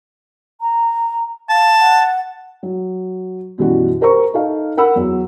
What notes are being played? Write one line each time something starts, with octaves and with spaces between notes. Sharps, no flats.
A#5
F5 A5
F#5
F#3
F#2 B2 E3 G3 F#4
G4 A#4 C5 A#5 C#6
D#4 A4 F5
A#4 F#5 B5 E6
E2 F#3